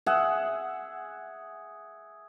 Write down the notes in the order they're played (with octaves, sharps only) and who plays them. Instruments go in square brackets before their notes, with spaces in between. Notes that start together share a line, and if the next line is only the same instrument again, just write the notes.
[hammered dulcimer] G#4 E5 F#5